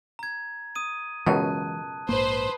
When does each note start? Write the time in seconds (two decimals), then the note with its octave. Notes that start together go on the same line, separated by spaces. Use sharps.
0.19 A#5 G#6
0.75 D#6 D#7
1.26 C#2 F#2 B2 E3 G#3 C#4 A5 F#6
2.09 A#1 G#2 A#3 B4 C5